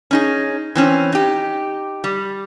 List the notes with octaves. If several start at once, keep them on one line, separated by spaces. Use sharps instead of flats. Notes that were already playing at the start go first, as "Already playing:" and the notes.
C#4 D#4 G#4
E3 C4 C#4
D#4 G4
G3